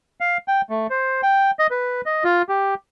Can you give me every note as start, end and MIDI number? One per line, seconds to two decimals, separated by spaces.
0.21 0.38 77
0.48 0.61 79
0.70 0.87 57
0.90 1.21 72
1.23 1.51 79
1.59 1.67 75
1.71 2.01 71
2.06 2.24 75
2.24 2.42 65
2.49 2.74 67